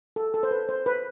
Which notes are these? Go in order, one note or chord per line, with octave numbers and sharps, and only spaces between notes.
A4
A4
C5
B4
C5
B4